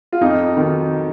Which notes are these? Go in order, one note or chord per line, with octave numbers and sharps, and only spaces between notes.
F4
F2 D#4
D#3 F#3